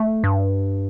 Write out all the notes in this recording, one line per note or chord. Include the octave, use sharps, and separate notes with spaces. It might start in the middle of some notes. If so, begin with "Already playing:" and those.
Already playing: A3
G2